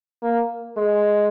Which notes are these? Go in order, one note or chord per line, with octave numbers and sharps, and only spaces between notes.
A#3
G#3